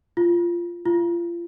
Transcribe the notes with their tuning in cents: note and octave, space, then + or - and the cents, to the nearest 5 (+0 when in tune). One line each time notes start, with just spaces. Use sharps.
F4 -15
F4 -30